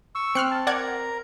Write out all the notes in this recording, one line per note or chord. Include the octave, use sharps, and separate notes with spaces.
C#6 E6
C4 F6 F#6 C#7
A5
A#4 D5 F#5 A#5 G#6